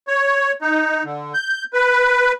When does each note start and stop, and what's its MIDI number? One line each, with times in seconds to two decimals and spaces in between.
0.08 0.52 73
0.61 1.03 63
1.05 1.33 50
1.34 1.64 91
1.73 2.32 71